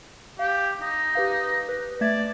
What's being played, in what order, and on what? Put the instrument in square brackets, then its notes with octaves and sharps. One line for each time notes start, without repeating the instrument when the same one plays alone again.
[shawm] G4 [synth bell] F5
[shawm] D#4
[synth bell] G4 B4 F5
B4
[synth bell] A3 E5 G#6 [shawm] D5